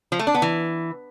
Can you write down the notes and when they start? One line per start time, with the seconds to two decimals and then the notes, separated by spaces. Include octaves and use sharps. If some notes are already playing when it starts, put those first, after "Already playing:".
0.12 F3
0.19 A3
0.27 D4
0.34 B3
0.42 E3